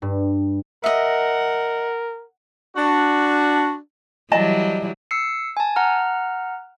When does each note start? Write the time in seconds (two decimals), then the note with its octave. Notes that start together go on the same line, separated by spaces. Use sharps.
0.02 G2
0.84 A#4 D#5 E5 F#5
2.76 D4 F#4
4.32 E3 F#3 G3 D5 D#5 A5
5.11 E6 C7 C#7
5.57 G#5 A5
5.76 F#5 A#5 F6